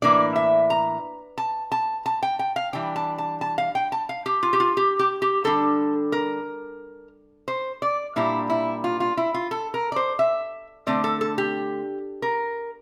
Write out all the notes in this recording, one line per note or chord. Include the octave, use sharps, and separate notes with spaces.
A2 E3 A#3 D4 D5
E5
A#5
A5
A5
A5
G5
G5
F5
E3 G3 D4 G5
A5
A5
A5
F5
G5
A5
F5
G4
F4
G4
F4
G4
G4
G4
D3 G3 D4 A4
A#4
C5
D5
A#2 G3 A#3 D4 E4
E4
F4
F4
E4
F4
A4
A#4
D5
C5
E5
D3 A3 C4 D5
A4
A4
G4
A#4